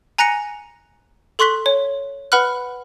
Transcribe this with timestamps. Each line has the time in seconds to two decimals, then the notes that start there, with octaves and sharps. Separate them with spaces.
0.18 G#5 A#5 F#6 A#6 C#7 F7
1.39 A4 C6 C#6 F#6 B6 G7
1.66 C#5
2.32 B4 F#5 B5 F6 F#6